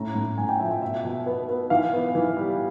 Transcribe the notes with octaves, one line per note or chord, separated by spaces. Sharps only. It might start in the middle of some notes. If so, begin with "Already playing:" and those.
Already playing: A2 C#4 A#5
A2
A2 G#5
G5
F3 E5
E5
B2 E5
B2
B3
B3
E3 F5
B3
E3
G3